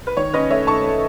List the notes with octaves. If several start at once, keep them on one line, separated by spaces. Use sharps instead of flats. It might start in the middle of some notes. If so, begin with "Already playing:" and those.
B4
D#3 C#5
C#4 B4 D#5
A3 C#5 E5
A3 A5 C#6
A3